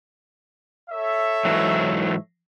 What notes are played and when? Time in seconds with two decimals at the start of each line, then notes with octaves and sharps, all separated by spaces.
0.90 A4 C#5 E5
1.45 G#2 E3 F#3